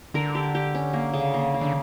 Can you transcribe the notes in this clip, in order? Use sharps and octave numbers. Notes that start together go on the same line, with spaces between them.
D3 A#4
G4
G4
C#4
A#3
C#3
A#3
A#3
D3